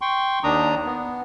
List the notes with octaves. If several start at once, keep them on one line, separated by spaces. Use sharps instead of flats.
G5 C6 C#6
D#2 D#3 D4 A#5 D#6
B3